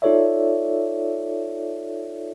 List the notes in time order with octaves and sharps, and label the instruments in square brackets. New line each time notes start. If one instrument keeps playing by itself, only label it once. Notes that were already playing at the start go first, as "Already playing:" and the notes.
[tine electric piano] D#4 F4 A4 C#5 D5 E5